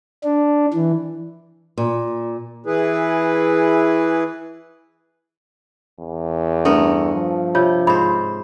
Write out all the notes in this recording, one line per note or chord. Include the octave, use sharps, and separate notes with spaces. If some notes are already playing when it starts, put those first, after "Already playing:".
D4
E3
A#2
E3 E4 G#4 B4
E2
G2 A3 B3 A#4
F3
C3 F4 C#5
G#2 C5 B5